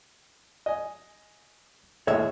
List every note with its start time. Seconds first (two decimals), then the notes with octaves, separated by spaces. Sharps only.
0.66 D#5 G#5
2.07 D#2 A2 G#3 C#5 E5